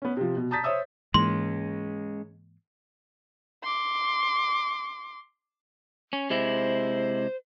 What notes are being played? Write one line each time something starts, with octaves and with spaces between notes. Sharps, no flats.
B3 C#4
C3 F3
B2
A5 A#5 D#6 G6 A6 B6
C5 C#5 E5 D#6 E6
G#2 E3 G#3 A#3 C#4 C6
C6 D6
C#4
C3 G#3 E4 C5